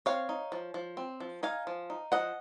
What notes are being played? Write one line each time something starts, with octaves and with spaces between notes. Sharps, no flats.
C4 C#5 F5
D#4
F3
F3
C4
F3
D#4 F5 G#5
F3
D#4
F3 D#5 F#5